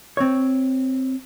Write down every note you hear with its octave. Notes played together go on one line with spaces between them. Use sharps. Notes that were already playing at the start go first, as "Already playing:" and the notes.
C4 C#5